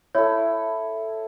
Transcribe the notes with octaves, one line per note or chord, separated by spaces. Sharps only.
E4 A4 C#5